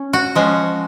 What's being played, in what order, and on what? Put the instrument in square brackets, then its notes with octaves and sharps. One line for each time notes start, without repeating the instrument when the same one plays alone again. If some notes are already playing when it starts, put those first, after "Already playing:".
Already playing: [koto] C#4
F#4
F3 G#3 C#4